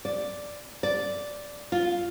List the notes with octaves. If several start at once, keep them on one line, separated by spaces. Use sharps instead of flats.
D5
D5
F4